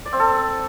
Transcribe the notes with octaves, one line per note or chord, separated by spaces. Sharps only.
D5
C4
A4